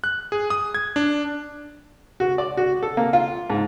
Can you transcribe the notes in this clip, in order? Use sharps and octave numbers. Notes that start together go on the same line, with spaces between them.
F#6
G#4
D#6
G#6
D4
F#4
D5
F#4
A4
A#3
F4
G#2